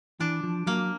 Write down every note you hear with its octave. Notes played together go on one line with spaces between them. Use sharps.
E3 D4
F3
F#3 A#3